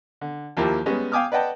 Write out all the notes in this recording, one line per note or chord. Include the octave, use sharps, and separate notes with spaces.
D3
D#2 F3 A#3 E4 G4 A5
G3 G#3 B3 C#4
F5 G5 G#5 D6 D#6 F6
B4 D5 D#5 F#5 G5 A5